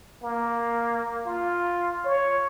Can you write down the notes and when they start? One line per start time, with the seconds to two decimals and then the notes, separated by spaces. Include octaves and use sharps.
0.23 A#3
1.26 F4
2.05 C#5